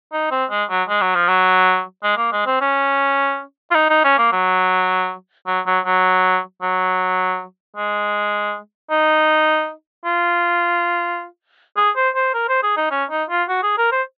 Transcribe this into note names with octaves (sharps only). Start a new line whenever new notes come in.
D#4
C4
G#3
F#3
G#3
F#3
F3
F#3
G#3
A#3
G#3
C4
C#4
F4
D#4
D#4
C#4
A#3
F#3
F#3
F#3
F#3
F#3
G#3
D#4
F4
G#4
C5
C5
A#4
C5
G#4
D#4
C#4
D#4
F4
F#4
G#4
A#4
C5